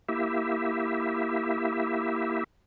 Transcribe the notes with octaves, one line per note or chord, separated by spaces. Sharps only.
A#3 E4 G4 E5